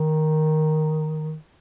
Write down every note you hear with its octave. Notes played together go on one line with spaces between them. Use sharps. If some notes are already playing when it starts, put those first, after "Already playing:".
Already playing: D#3